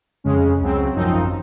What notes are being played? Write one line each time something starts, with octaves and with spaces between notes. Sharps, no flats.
F2 C#3 G#3 C#4
C#2 C#3 F#3 C4
G#1 F#2 F3 C4 D#4